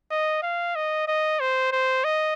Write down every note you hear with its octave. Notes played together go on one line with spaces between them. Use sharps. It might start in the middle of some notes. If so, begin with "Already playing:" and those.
D#5
F5
D#5
D#5
C5
C5
D#5